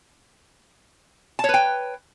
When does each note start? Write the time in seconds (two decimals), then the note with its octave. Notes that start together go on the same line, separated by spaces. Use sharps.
1.39 A5
1.44 C#5
1.49 B4
1.54 G5